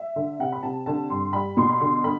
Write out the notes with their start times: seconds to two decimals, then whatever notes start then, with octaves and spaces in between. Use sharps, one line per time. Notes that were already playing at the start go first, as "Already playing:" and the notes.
Already playing: E5
0.16 D3
0.39 C3 F#5
0.52 B5
0.63 C3 A5
0.86 D3 A5
1.10 G2 C6
1.33 G3 B5
1.57 B2 C6
1.69 B5
1.81 D3 C6
2.04 D3 B5